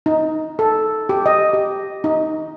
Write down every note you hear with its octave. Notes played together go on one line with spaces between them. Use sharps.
D#4
A4
G4
D#5
G4
D#4